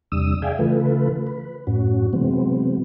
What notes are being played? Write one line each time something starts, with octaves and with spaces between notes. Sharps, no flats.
E2 C3 G3 D4 D#6 E6
G#4 D5 E5 F5 G5 G#5
C#3 E3 A3 F4 A4 B4
B4
F#2 A2 C#4 F#4
C3 E3 F#3 G#3 B3 C4